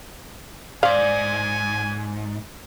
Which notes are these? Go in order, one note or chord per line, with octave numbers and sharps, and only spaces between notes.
G#2 C5 D5 F5 G#5